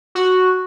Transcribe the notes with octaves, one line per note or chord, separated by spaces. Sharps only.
F#4